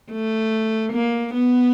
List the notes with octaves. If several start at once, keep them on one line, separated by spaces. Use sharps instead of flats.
A3
A#3
B3